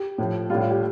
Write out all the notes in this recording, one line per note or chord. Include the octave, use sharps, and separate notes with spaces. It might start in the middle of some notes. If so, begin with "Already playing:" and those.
Already playing: G4
A2 F3
A2 G3 F4
F4
G4